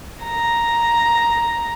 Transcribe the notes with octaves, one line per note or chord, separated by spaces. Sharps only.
A#5